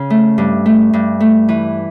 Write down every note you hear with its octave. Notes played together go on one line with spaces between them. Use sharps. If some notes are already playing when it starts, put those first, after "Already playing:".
Already playing: C#3
A3
G2
A3
G2
A3
E3